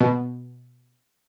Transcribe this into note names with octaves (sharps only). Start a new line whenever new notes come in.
B2